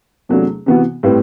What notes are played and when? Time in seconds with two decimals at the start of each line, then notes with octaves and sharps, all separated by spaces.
0.29 E2 C3 F#3 A3 D4
0.66 C3 E3 B3 F#4
1.03 A2 G3 C4 G4 B4